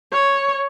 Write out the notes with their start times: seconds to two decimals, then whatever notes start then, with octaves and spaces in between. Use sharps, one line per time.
0.12 C#5